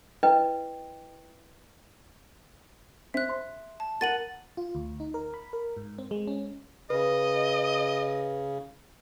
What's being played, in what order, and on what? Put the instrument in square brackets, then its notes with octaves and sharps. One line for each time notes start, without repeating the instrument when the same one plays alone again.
[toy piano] E4 B4 D#5 G5
[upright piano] C4 [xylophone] E5 F#6
[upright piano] C6
[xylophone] A5
[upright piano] A#4 F#5 [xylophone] A6 D#7 F#7
[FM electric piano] F4
D2
D#4
A#4
B5
A#4
G#2
C4
G#3
C#4
[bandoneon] C#3 [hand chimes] B4 [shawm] D#5